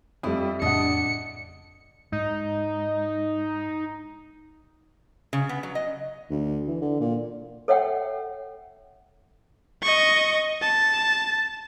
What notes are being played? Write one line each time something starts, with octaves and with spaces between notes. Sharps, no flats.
F2 G3 E4
F2 A2 C#3 D4 D#5 F#5 C#7
G#2 D#4
C#3
B3
F#3
D#5
D2
E3
D3
A#2
A4 C#5 E5 F#5 G5
D#5 C#6
A5